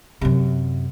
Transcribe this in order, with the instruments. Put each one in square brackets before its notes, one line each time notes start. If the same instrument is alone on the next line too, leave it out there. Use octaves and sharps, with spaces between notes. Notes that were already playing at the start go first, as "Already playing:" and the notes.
[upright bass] F#2 C3